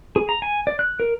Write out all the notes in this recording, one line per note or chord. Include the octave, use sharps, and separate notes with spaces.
G#4
A#5
G#5
D5
F#6
A#4